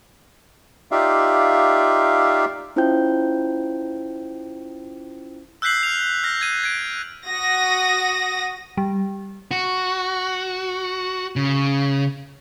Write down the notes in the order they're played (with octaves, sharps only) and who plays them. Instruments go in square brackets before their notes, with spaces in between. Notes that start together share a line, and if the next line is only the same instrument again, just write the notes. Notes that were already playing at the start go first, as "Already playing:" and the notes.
[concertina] D#4 F4 G4 D5 E5 F5
[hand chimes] C#4 E4 F4 C5 G5 G6
[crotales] E6 F#6 G6 B6 C7 F#7
F6 F7
F6 G6 A#6
G#6 D#7
G#6 D7
[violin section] F#4 D#6 A#6
[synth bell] G3
[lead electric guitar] F#4
C#3